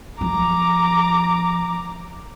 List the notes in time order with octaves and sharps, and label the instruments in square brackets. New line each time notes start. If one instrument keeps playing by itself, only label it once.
[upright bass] F3 [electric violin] A#5 D6